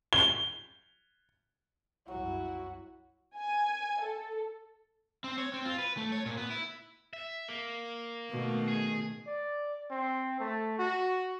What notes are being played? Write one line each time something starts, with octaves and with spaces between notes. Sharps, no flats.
G7
C2 F#2 F#3 E4 F#4
G#5
A4
C4
C#5
C4
F4
B4
A3
C#5
A#2
B3
E4
E5
A#3
B2 D#3 A3
G#4
D5
C4
A3
F#4